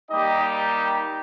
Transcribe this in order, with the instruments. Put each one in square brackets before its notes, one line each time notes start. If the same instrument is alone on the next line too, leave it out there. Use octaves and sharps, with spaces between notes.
[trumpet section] G3 A#3 D#4 G4 D#5